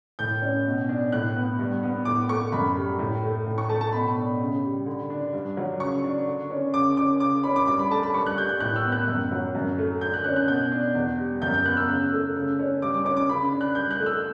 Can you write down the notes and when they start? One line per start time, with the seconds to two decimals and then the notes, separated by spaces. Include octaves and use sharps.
0.19 A2 G6
0.42 C#4
0.66 B2
0.89 D4
1.12 A2 F#6
1.36 B3
1.59 G2
1.83 B3
2.05 A2 D6
2.29 A3 C#6
2.52 F#2 B5
2.77 G3
2.99 A2
3.23 A3
3.46 A2
3.58 C#6
3.69 A3 A5
3.81 A5
3.92 B2 B5
4.16 D4
4.40 C#3
4.64 G3
4.86 D3
5.10 D4
5.33 G2
5.57 F#3
5.80 C#3 C#6
6.04 D4
6.27 D3
6.50 C#4
6.74 C#3 D6
6.97 C#4 D6
7.20 C#3 D6
7.43 C#4 B5
7.56 D6
7.67 G2 D6
7.79 B5
7.91 A3 A5
8.03 B5
8.14 G2 C#6
8.27 F#6
8.37 G3 G6
8.49 G6
8.60 A2 F#6
8.76 E6
8.85 B3
8.92 F#6
9.08 F#2
9.32 F#3
9.55 F#2
9.78 A3
10.01 D3 G6
10.14 F#6
10.24 C#4 F#6
10.36 F#6
10.48 B2 G6
10.72 D4
10.95 E2
11.19 G3
11.42 F#2 G6
11.54 G6
11.66 B3 F#6
11.77 E6
11.88 C#3
12.12 A3
12.36 C#3
12.59 C#4
12.82 G2 D6
12.94 D6
13.05 C#4 D6
13.17 D6
13.29 C#3 B5
13.52 D4
13.61 F#6
13.75 G2 G6
13.91 F#6
14.00 A3
14.06 E6